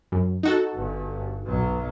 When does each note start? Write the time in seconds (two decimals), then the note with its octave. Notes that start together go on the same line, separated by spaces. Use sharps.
0.12 F#2
0.43 D#4 F#4 A4
0.74 G1 G2
1.46 B1 F#3